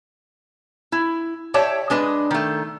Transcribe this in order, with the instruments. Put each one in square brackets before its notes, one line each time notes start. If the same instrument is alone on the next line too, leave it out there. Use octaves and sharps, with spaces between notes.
[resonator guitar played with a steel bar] E4
G4 C#5 D5 E5 A5
G#3 D4 B4 D#5
D#3 A3